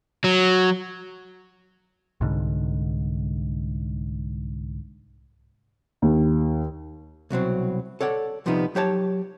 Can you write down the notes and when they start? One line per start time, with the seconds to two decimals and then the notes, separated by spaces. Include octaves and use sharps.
0.24 F#3
2.21 C2 G#2 D3
6.02 D#2
7.30 C2 B2 F#3 C4
8.01 A4 C#5 D5 F#5
8.46 C2 F3 G3 B3 D#4
8.75 F#3 G4 C#5 A5